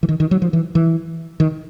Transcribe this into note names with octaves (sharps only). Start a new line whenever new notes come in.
E3
D#3
D#3
F#3
F3
E3
E3
D#3